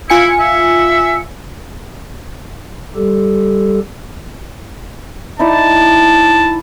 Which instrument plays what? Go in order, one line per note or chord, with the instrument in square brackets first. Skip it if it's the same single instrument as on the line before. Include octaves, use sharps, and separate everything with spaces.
[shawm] E4 [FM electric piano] F4 G#5 C#7
[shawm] E5
[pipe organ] G3 G4 A4
[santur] D#4 E4 D5 [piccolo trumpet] A5